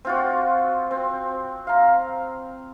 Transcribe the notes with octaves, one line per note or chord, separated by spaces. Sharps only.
C4 F4 F#4
C4
F5 A#5